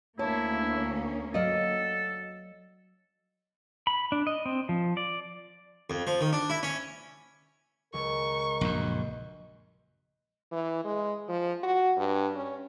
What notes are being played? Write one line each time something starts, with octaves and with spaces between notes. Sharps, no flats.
D2 A#3 C#4 E4 C#5 A5
F#3 A4 D5 D#5 F5
B5
D4
D#5
C4
F3
D5
F2
F3
D#3
D4
E4
C#4
C#2 A#4 C#6
A#1 F#2
E3
G#3
F3
F#4
G2
C#4